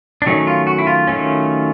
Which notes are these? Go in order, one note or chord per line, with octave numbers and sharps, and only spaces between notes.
D4
D#3 F#3 A3 C#4 D#4
F4
F#4
E4
F4
D#3 F#3 A3 C#4